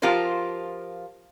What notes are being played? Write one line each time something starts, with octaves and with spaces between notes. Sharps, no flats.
F3 F4 G4 A#4 C5